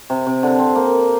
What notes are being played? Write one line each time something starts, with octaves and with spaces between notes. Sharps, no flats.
C3
C3
D3
C4
A#3